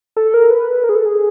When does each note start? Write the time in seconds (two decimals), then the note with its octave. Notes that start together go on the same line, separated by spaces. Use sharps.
0.16 A4
0.34 A#4
0.50 B4
0.84 A#4
0.89 G#4
0.95 A4
1.05 G#4